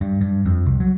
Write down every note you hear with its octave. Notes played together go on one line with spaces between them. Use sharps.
G2
G2
F2
C2
F#3